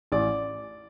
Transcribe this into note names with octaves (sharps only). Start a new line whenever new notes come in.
A1 D5